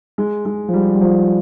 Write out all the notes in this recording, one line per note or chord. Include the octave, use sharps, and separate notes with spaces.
G#3
G#3
F3
G3
G3
F3